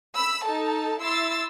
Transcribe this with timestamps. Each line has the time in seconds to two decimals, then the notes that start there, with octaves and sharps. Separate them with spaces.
0.14 B5 E6
0.44 D#4 A4 A5
1.00 E4 C6 E6 A6